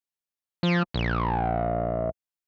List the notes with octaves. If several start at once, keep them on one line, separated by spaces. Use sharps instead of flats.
F3
A#1